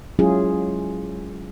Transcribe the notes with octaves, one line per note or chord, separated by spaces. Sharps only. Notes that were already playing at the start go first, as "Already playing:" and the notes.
F#3 G#3 C#4 E4 F4 G#4